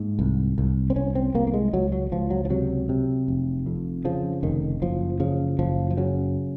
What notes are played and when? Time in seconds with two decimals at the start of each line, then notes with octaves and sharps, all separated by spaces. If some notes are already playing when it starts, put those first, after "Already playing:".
Already playing: G#2 A#3
0.19 C2
0.58 C2
0.90 C4
0.96 C2 C#4
1.15 C4
1.34 C2 A#3
1.47 A#3
1.54 G#3
1.73 C#2 F#3
1.92 F#3
2.12 C#2 F3
2.30 F#3
2.45 F3
2.50 C3 F#3
2.89 C3
3.28 F1
3.66 F2
4.05 C#3 F3
4.43 F1 D#3
4.82 F#1 F3
5.20 C#3 F3
5.59 F#1 F3
5.91 F3
5.97 C#3 F#3